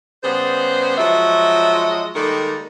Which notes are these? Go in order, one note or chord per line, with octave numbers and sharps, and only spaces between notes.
C#3 G3 B3 G#4 C5
F3 F#3 G#3 D#5 E5
D#3 G3 G#3 A#3 A4 A#4